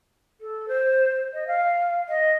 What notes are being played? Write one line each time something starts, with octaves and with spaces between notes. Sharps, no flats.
A4
C5
D#5
F5
D#5